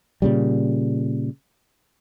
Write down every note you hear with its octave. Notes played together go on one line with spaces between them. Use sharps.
A#2 C#3 G3